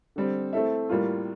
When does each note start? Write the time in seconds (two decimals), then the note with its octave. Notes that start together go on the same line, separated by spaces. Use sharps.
0.16 D3 G3 C4
0.53 A3 C4 E4 A4 E5
0.89 A2 G3 A#3 F4